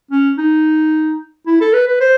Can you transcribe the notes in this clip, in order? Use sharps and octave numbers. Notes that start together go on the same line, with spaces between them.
C#4
D#4
E4
A4
B4
B4
C5